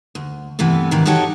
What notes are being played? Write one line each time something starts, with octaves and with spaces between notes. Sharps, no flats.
D2
G2 C3 E3 A3 B3
G#2 C3 D#3 E3
D#4 F#4 G4 A4 C#5 D#5